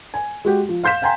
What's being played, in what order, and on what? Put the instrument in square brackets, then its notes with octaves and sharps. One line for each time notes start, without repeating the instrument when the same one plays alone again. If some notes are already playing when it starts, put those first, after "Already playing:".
[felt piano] G#5
G#3 F#4 G4
F3
F5 C6 G6 B6 E7
F5 G5 G#5 A#5 C6